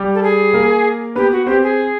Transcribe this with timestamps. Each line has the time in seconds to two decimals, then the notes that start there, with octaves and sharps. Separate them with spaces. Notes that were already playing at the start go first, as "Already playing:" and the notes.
Already playing: G3 G4
0.15 A4
0.23 G#4
0.53 A#3 A#4
1.16 B3 G4 B4
1.32 F#4
1.46 C4 G4 C5
1.63 G#4